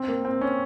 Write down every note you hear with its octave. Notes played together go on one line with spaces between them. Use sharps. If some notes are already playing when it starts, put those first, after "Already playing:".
Already playing: C4
A#3
C4
C#4